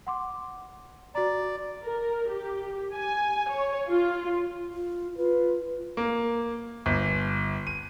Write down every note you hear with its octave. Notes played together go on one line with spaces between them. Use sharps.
F#5 C6 D6
F#4 D5 A#5
A#4
G4
G#5
C#5
F4
F4
F4 B4
A#3
G1
D#7